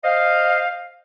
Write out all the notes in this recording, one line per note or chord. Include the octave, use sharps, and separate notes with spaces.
C5 D#5 F5